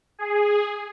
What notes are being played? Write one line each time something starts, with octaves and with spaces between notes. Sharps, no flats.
G#4